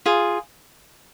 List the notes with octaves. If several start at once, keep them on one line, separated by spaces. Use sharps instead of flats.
F4 G#4